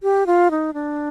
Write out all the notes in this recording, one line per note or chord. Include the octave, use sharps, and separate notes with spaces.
G4
F4
D#4
D4